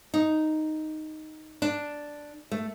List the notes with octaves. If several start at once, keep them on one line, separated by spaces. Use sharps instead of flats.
D#4
D4
A3